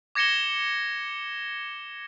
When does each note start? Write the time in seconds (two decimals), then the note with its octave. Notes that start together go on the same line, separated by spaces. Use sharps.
0.15 D6 G#6 A#6 C#7 E7 G7